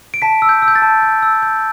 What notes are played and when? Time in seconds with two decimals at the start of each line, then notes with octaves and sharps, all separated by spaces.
0.14 D7
0.22 A5 B6
0.42 E6
0.49 G6
0.62 E6
0.68 G6
0.75 A6
0.82 A5
1.03 G6
1.22 E6
1.42 G6